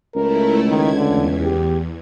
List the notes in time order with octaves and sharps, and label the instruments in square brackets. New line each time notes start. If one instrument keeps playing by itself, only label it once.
[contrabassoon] C#2 [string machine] A3 E4 [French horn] A#4
[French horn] D#3 [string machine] G#6
[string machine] E2 [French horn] D3
[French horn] G4